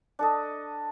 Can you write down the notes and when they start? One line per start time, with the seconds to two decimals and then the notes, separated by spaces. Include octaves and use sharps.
0.19 D4 A4 D#5